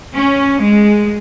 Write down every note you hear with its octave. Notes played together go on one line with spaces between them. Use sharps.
C#4
G#3